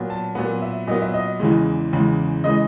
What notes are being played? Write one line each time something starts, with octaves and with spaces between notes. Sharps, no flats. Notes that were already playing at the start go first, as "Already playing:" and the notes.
Already playing: A#2 F#3 B3
A5
A#2 F#3 B3
E5
A#2 F#3 B3 D#5
E5
D#5
E2 C#3 E3 G#3
E2 C#3 E3 G#3
C#3 E3 G#3 D#5